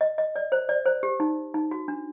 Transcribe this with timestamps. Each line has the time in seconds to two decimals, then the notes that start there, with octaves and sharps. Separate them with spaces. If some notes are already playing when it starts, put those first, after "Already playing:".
0.01 D#5
0.18 D#5
0.36 D5
0.52 C5
0.69 D5
0.86 C5
1.03 G4
1.20 D#4
1.54 D#4
1.71 F#4
1.88 D4